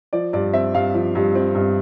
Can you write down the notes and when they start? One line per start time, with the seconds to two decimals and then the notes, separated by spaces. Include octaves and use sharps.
0.13 F3 D5
0.33 G2 D5
0.53 C4 E5
0.74 G2 F5
0.94 F3
1.15 G2
1.35 C4
1.55 G2